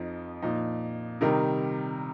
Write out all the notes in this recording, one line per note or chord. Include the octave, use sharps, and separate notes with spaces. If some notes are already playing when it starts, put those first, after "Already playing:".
Already playing: F2 F3 D#4
A#2 F3 D#4
C3 D#3 G3 D#4 A#4